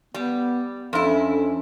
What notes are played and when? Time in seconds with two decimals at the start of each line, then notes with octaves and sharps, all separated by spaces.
0.14 G3 B3
0.93 F2 C#4 D4 E4 A4